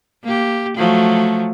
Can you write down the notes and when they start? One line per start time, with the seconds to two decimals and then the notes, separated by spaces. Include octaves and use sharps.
0.24 A#3 G4
0.77 F3 F#3 A3